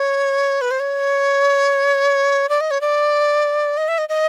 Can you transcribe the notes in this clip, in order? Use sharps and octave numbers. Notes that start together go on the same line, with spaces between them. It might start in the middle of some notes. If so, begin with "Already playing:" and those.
Already playing: C#5
B4
C5
C#5
D5
D#5
C#5
D5
D#5
E5
D#5
D#5